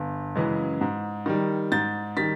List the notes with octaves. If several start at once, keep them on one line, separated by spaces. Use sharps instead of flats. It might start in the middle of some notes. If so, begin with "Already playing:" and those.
Already playing: G1
F#2 C#3 E3 G#3
G#2
D#3 G3
G#2 G6 A6
D#3 G3 A6 B6